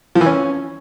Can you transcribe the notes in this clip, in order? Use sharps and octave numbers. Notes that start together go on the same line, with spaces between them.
F3
E3
C#4